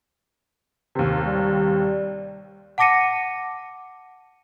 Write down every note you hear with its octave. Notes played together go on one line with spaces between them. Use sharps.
D#2 C3
G3
F#5 A5 D6 A#6 C#7 D#7